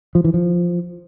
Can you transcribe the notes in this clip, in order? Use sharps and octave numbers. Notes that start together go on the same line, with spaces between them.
F3
E3
F3